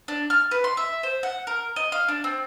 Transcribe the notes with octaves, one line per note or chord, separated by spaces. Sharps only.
D4
F6
B4
C6
E5
C5
F#5
A#4
D#5
F5
D4
C4